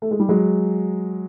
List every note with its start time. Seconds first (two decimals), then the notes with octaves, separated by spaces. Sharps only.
0.02 A3
0.11 G#3
0.20 G3
0.29 F#3 G#3